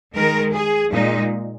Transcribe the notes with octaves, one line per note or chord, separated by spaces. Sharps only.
D#3 G#3 A#4
G#4
A#2 G#3 D#4